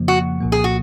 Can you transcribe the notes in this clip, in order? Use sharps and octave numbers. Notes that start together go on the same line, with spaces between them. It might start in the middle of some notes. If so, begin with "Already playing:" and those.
Already playing: F2 C#3 F3 A#3
F#4
C2 A#2 F3 A#3
G#4
F#4